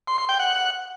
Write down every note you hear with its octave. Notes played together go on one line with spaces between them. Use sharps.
C6
C6
G5
F#5